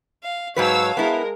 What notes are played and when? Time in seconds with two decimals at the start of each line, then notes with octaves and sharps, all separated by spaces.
0.23 F5
0.56 G#2 F#3 B4 C#5 F5 A5 E6
0.97 G#3 B3 E4 A#4